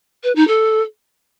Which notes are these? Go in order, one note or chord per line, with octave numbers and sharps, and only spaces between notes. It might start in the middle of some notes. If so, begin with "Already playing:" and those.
B4
D#4
A4